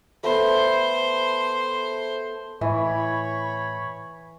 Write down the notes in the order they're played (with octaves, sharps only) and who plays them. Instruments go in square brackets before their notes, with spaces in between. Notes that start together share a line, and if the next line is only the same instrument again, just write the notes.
[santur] A3 B3 [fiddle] C5
[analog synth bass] A2 [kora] E3 [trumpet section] C#5 B5